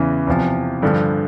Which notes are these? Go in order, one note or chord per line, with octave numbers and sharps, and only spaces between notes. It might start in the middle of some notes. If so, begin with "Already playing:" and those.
Already playing: E2 C#3 E3
E2 C3 F3
G2 D3 F3